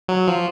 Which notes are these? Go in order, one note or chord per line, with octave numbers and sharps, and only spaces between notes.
F#3
F3